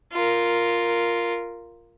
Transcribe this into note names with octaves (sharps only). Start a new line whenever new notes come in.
F4 A#4